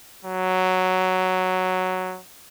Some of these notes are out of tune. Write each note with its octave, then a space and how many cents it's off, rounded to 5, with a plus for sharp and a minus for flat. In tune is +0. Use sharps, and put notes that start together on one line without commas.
F#3 +0